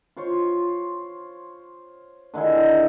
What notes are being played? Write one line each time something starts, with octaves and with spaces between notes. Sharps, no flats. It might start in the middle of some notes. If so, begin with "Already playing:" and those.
F4 C5 C#5
D3 D#3 E4 G#4